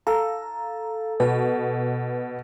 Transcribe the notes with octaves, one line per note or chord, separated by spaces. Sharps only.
A4 F5 A#5
B2 B4